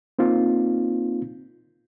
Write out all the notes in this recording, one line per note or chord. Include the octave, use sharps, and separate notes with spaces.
A#3 C4 D#4 F4